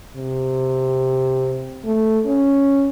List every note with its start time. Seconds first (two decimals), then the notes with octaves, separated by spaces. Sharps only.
0.16 C3
1.85 A3
2.26 C#4